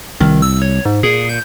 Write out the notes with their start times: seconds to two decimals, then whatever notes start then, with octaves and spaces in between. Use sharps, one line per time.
0.20 C2 D#3
0.42 E6
0.62 C#5
0.85 G#2
1.03 A#2 G#4
1.29 G6